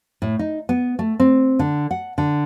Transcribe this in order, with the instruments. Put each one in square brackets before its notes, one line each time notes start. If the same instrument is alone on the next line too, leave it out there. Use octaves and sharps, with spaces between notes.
[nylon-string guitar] A2
D#4
B3
A3
C4
D3
F#5
D3